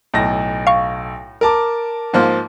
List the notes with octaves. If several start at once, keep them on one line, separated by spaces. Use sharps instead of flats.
B1 A2 A#6
F5 C#6
A#4 A5 D6
G#2 F3 A#3